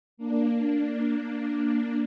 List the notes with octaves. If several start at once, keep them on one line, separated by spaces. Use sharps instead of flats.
A#3 D4